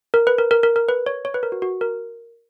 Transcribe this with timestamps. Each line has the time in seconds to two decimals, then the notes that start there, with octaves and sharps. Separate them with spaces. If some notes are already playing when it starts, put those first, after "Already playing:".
0.14 A#4
0.27 B4
0.38 A#4
0.51 A#4
0.63 A#4
0.76 A#4
0.89 B4
1.06 C#5
1.25 C#5
1.34 B4
1.43 A#4
1.52 F#4
1.62 F#4
1.81 A#4